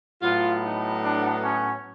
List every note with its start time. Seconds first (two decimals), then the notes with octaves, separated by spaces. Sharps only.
0.22 A2 F#3 B3 F4
0.63 D#4
1.03 D4
1.43 C#4